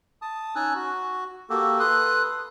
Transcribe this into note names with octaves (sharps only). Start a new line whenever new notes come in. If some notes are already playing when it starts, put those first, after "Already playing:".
A5 D#6
C#4 D#4 G#5 E6 F#6
F#4
A#3 F#4 G4 A4
A4 B4 C6 D#6 F#6